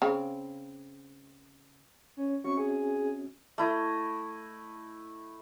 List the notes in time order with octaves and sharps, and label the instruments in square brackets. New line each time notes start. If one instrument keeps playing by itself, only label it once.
[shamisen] C#3 C4
[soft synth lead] C#4
[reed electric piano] C4 C#4 F#4 [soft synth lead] C#6
[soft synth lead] G#4
[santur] A3 E4 D#5